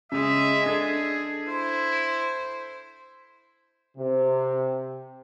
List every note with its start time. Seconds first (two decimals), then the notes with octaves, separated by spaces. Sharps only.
0.12 C#3 G#3 D#5 E5
0.66 D4 G#4 A4
1.48 E4 C5
3.97 C3